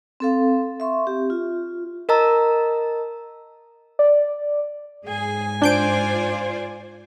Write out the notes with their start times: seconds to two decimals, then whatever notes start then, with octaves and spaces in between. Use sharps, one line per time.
0.20 C4 A4 F5
0.80 E5 C6 C#6
1.06 C4 G4
1.30 F4
2.09 A#4 D#5 A5 A#5 E6
3.99 D5
5.07 G#2 G#4 G#5
5.62 D4 F4 C5 D5 G6 D7